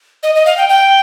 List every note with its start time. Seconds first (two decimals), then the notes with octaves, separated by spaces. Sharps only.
0.23 D#5
0.35 D#5
0.46 F5
0.57 G5
0.69 G5